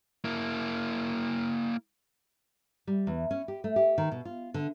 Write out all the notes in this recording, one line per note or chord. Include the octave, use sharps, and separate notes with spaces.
A#3 E4
G3
E2
C#4
G4
A3
G4
D#3
B2
F4
D3